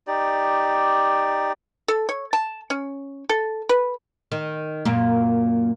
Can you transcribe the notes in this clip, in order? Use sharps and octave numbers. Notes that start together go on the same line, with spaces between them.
D#4 G4 D5
A4
C#5
A5
C#4
A4
B4
D#3
F#2 A#2 A#3